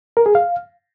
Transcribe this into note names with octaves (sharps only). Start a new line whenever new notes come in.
A#4
G#4
F5